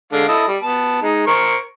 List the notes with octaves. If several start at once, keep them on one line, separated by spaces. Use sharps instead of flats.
D3 G#3 F5
E4 A4 D#5
G3
B3 A5
G#3 D#4
A#4 C5 C#6